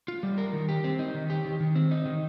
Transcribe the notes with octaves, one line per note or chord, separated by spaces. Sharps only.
F4
G3
A#4
D#3
G4
C4
D#4
D#3
G4
D#3
D#3
C4
D#4
D#3